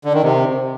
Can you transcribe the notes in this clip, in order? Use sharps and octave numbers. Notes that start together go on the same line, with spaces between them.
D3
D#3
C3